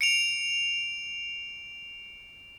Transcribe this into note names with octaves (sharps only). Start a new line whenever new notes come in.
C#7 D7 F7